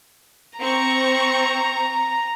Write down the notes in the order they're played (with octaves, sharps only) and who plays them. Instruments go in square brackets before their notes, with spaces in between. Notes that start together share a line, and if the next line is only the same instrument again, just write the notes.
[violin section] C4 C#6 [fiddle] A#5